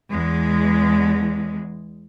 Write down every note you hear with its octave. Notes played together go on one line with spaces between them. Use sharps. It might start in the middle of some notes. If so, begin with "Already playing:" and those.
E2 G#3